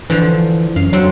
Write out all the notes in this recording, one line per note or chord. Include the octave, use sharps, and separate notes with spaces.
D3 E3 F3
F#2 F5
D3 F#3 C4